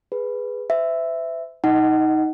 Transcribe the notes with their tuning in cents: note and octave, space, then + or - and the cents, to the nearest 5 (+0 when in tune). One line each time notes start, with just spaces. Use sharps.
G#4 +0 B4 +0
C5 -45 E5 +0
D#4 +15 D#5 -20 F#5 +20